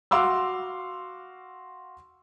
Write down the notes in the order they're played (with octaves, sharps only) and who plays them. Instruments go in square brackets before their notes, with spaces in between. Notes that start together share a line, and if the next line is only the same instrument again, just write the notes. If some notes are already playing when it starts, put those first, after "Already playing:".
[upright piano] F#4 F5 C6 D6 E6